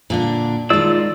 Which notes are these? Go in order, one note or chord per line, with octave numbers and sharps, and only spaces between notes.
A#2 D3 D4
D#3 G#3 F4 D5 E6